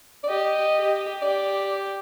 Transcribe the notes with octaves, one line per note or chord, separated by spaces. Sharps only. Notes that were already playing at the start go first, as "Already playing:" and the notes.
D5
G4 D#5
G4
G4 D5